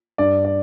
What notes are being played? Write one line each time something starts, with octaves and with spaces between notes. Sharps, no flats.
G2 D5
D5